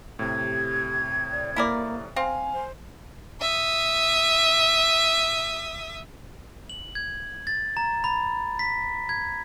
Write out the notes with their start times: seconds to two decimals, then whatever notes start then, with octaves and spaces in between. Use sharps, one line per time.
0.19 A2 C3 G#6
0.40 G4
1.31 D5
1.56 A#3 E4 A#4 D5
2.16 C4 F5 G#5
2.53 C5
3.41 E5 D#6
6.70 F#7
6.95 G#6
7.47 A6
7.77 A#5
8.04 B5
8.59 B6
9.09 G#6